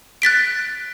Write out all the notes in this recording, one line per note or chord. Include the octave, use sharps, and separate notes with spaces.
F#6 A6 B6 D7